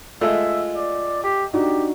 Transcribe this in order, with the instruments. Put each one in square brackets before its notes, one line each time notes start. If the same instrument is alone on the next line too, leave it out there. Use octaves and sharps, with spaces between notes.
[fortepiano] G#3 A3 [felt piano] F4 [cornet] E5
[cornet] D5
G4
[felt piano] D4 D#4 F#4 [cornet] G4